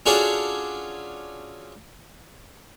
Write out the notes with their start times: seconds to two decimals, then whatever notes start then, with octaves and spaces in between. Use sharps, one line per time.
0.06 C#4 D4 F4 F#4 G#4 A4